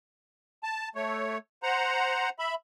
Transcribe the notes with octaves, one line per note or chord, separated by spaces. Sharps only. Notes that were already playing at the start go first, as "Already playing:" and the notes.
A5
A3 C#5
C5 F#5 A#5
E5 B5